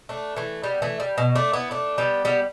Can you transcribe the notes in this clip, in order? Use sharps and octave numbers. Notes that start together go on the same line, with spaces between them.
A3 D4
E3 A3
G3 B3
E3 A3
G3
B2
A3 D4
B3 E4
A3 D4
G3 B3
G3 B3